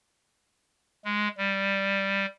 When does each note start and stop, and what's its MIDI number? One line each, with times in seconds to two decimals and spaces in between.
1.05 1.28 56
1.37 2.26 55